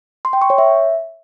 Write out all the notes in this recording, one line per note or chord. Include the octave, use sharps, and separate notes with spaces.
C6
G5
C#6
C#5
E5